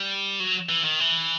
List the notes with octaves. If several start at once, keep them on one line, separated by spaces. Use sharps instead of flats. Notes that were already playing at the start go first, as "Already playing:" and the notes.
Already playing: G3
F#3
E3
D#3
E3